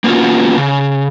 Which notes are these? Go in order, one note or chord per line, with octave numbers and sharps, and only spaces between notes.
A#3 B3 C#4 F4 F#4
C#3